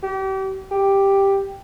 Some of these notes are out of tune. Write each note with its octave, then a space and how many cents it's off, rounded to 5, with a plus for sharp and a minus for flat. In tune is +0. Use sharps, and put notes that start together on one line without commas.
G4 -35
G4 +5